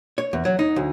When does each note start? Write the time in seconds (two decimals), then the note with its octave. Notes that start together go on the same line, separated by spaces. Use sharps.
0.18 C#5
0.33 E2
0.45 F#3
0.59 D#4
0.76 D2